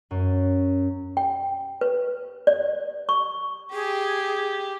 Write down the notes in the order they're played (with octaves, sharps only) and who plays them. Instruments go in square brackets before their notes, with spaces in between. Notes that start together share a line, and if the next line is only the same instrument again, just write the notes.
[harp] F#2
[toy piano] G5
B4
D5
C#6
[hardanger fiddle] G4 [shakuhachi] G#4